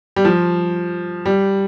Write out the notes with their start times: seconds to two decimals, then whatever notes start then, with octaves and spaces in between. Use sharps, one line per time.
0.16 G3
0.25 F3
1.26 G3